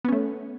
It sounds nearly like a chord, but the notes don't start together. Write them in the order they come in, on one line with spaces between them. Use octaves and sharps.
B3 C#4 A3